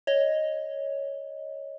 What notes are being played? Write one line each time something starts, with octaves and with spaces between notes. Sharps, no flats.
C#5 D#5